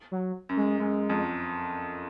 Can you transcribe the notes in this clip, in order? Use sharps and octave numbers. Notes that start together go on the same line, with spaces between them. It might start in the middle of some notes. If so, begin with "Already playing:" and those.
F#3
F#2
G#3
F#2 G#3
F2